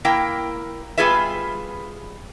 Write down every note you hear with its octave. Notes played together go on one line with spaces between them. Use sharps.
A#3 E4 A#4 F5 G5
G3 B3 F4 G#4 B4 E5